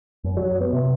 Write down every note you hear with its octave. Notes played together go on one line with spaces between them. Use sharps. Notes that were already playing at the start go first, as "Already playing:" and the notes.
F#2
F#3
B3
C3